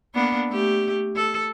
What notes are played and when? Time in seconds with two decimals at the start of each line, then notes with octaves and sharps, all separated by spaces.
0.14 A#3 B3 D4
0.50 A3 G4
1.15 A4